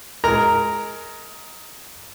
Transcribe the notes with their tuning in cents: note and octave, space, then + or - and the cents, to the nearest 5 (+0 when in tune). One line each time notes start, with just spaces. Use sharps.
G#3 +15 A#4 -5 A#5 +0